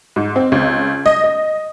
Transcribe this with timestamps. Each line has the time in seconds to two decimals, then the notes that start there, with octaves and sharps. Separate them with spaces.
0.16 G#2
0.36 C4
0.52 C#2
1.06 D#5
1.24 D#5